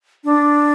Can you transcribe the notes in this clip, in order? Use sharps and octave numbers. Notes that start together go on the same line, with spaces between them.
D4